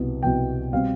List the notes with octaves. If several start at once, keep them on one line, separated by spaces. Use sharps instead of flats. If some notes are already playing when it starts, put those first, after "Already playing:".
Already playing: C2 B2 B3
C2 B2 B3 G5
B2 G3 C4 F5